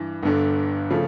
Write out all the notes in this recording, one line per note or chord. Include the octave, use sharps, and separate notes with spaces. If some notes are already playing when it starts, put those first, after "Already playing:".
Already playing: G2 E3
G1 G2 D3
C#3 F3 A3